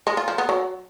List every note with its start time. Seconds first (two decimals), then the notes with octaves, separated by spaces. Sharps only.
0.07 G#3
0.17 F4
0.28 F3
0.38 B3
0.49 F#3